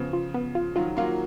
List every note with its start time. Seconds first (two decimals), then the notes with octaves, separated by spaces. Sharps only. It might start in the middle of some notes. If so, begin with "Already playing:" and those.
Already playing: C#3 F3 B3
0.13 F4
0.34 B3
0.55 F4
0.76 D#3 F#3 F4
0.97 F#3 A#3 F4